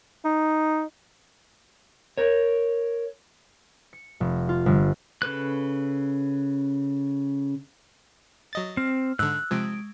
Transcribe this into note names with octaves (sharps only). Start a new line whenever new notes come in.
D#4
A#4 C#5
C#7
F1
F4
G1
C#3 A4 B4 F#6
F#3 D#5 A6
C4 F6
G#2 D3 E6 F#6
C3 F3 G#3 D7